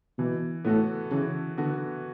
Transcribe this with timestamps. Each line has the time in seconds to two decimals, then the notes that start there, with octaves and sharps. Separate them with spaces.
0.18 B2 E3
0.65 A2 B3 F#4 A4
1.11 C#3 E3
1.57 D3 B3 F#4 A4